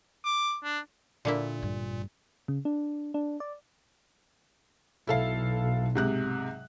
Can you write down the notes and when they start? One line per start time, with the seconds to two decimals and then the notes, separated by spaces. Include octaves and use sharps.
0.25 D6
0.64 D4
1.25 A#2 D3 A#3 E4
1.58 A1 G2
2.48 C#3
2.65 D4
3.14 D4
3.40 D5
5.07 B1 E4 A4 F5
5.95 G#2 C3 F#6